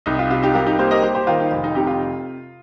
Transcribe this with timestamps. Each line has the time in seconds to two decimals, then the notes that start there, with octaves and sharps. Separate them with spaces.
0.06 C2 D#4
0.19 F4
0.30 C3 F4
0.43 D#4 G4
0.54 G3 F4 A#4
0.66 D#4 G4
0.79 A#3 G4 C5
0.91 A#4 D#5
1.03 G3 G4 C5
1.15 G4 C5
1.27 D#3 F4 A#4
1.40 D#4
1.51 F1 F4
1.64 D#4
1.75 C3 D#4 G4
1.87 F4